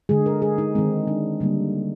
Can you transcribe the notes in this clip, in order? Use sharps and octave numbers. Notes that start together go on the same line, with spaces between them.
D3 G#3 G#4
A#4
G#4
D#4
D#3 G#3 C4
D4
D3 G3 A#3